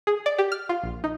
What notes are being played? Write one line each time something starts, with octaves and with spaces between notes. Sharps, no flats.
G#4
D5
G4
F6
F4
A#1
D#4